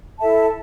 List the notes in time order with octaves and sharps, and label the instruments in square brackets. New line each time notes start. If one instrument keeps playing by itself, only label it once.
[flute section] E4 A4 E5 A5